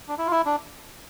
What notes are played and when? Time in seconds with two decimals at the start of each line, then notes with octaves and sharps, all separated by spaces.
0.08 D4
0.18 E4
0.26 F4
0.32 E4
0.46 D4